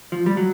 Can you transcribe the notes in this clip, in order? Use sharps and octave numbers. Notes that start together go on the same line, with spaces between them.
F3
G3
F#3